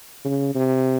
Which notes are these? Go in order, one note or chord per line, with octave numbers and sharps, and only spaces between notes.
C#3
C3